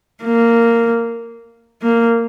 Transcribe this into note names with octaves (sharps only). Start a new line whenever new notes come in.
A#3
A#3